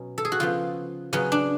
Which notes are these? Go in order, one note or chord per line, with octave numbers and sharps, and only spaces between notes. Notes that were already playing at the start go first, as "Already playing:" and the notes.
Already playing: B2 F#3 C#4
A4
G#4
F#4
C#3 F3 B3 F4
C#3 F#3 B3 C#4
D4